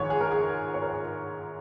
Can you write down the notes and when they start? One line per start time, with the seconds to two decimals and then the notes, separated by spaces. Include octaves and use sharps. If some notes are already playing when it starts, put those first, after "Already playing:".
Already playing: A#1 G#2 D#3 C#5
0.10 G#4
0.21 A#4
0.32 G#4
0.74 C#5
0.82 A#4
0.90 G#4